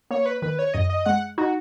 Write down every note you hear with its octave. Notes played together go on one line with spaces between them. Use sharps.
A#3 C#5
B4
D#3 B4
C#5
F#2 D#5
D#5
G#3 F#5
D#4 F#4